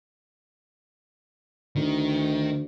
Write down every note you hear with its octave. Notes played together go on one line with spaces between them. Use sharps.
D2 D#3